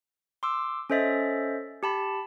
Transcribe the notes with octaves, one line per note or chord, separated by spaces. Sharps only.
C6 D6 E6
C#4 A4 C5 D#5 E5 A6
G4 A5 B5